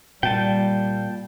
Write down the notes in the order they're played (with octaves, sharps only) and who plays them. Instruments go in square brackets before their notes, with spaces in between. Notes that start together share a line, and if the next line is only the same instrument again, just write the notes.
[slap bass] A#2 [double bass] G3 [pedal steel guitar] G5 A5